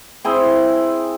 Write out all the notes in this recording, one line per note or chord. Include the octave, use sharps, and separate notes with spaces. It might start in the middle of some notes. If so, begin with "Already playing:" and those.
C4 E4 G#4 G5